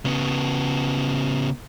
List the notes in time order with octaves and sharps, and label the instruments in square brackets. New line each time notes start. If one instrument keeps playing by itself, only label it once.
[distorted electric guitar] C#3 B3